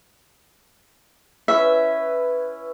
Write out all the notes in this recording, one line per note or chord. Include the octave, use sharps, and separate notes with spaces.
C#4 E4 B4 E5